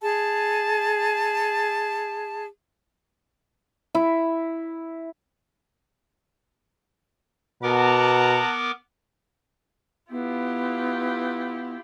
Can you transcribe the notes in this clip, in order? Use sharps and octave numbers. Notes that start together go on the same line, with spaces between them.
G#4 A5
E4
B2 B3 A#4 F#5 A5 A#5 D6
B3 E4 F4 G4